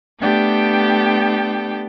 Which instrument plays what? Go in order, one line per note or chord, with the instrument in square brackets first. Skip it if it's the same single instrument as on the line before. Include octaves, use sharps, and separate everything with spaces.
[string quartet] A3 B3 D4 G4 A4 G5